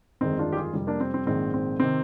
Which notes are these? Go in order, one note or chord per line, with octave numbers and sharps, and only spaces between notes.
G1 F2 D#3 G#3 C4 D#4
D4 F4
G4
F4 G#4
F2 C3 G3
A#3 D4
C4
C4
A#1 G#2 D#3 G#3 C4
C4
C3 D#3 C4